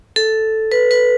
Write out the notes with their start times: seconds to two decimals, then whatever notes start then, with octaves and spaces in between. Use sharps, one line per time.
0.16 A4
0.72 B4
0.91 B4